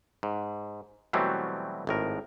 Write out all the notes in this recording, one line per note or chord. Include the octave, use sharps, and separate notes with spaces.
G#2
B2 E3 F#3 G3 A3 C4
G#1 A2 A#4